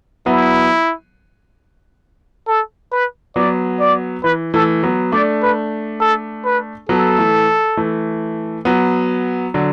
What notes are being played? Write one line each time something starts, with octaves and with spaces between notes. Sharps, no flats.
F#3 B3 E4
A4
B4
F#3 B3 D5
D5
E3 B4
E3 A3 A4
F#3 B3
A3 D4 D5
B4
A4
B4
F#3 B3 A4
E3 A3
E3 A3
F#3 B3
D3 F#3